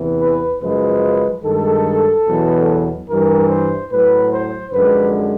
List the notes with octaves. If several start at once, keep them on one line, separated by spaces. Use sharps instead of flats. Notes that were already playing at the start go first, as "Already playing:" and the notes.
Already playing: E2 C3 E3
B4
F#2 C#3 F3 G#3 B4
G2 D#3 G#3 A4
E2 B2 F#3
G2 E3 G3 A#4
C5
A2 F#3 B4
C5
F#2 D3 F3 G#3 B4